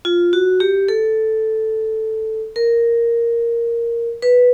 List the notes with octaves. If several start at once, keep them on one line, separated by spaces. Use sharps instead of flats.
F4
F#4
G4
A4
A#4
B4